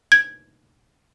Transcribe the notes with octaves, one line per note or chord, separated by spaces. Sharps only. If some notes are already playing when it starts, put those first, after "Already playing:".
G#6